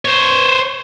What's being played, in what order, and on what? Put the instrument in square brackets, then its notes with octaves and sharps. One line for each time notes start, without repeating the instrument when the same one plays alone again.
[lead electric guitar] C5 C#5